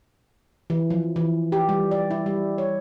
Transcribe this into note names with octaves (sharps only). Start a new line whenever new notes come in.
E3
F3
E3
G4
G3
D5
E4
G3
C#5